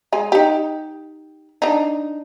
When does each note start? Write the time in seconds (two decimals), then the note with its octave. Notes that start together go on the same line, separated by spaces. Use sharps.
0.13 G#3 G#5
0.32 D#4 G4
1.62 D4 D#4